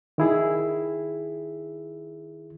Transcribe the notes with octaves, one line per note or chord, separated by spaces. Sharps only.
D#3 E4 G#4